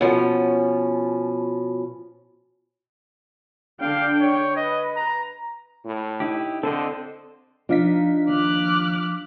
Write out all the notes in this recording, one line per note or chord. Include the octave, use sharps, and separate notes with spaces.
B2 F3 C#4
D3 D4 F5 G5
C#5
B4 D#5
A#5
A2
D#4 E4 G4
D3 C4 A4 C5 D#5
F3 D4 D#4 F5 B6
D#2 D6 F6 F#6